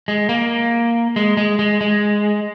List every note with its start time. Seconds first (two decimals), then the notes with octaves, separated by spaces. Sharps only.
0.08 G#3
0.29 A#3
1.16 G#3
1.37 G#3
1.59 G#3
1.81 G#3